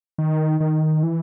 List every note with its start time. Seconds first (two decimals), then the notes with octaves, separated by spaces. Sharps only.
0.18 D#3
0.60 D#3
1.03 E3